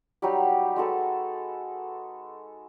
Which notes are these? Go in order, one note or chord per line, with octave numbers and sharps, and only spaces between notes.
F#3 G3 D#4 G4
G#3 F#4 A4 B4